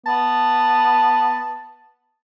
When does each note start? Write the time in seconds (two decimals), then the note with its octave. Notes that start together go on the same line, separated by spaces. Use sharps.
0.06 B3 A5